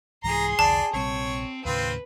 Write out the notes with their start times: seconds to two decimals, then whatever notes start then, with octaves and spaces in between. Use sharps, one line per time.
0.24 C2 G#2 E3 G#4 A#5 C6
0.59 C2 F2 D3 D5 A5
0.93 A#1 C3 G3 C4 C#5
1.65 D#2 A2 C#3 C4 F4 B4